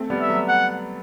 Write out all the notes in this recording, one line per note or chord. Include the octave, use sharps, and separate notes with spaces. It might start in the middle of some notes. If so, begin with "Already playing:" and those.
Already playing: A3 C4
G3 B3
E5
F#3 A3
F#5